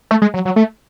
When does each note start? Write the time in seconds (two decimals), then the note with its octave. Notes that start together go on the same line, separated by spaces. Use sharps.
0.11 A3
0.22 G#3
0.34 F#3
0.45 F#3
0.56 A3